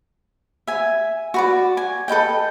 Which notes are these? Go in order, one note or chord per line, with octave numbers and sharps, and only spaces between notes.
E5 G#5
F#4 B4 D5
G#5
A4 B4 D#5 G5